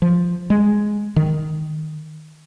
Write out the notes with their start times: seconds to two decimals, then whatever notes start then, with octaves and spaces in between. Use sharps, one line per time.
0.02 F3
0.50 G#3
1.16 D#3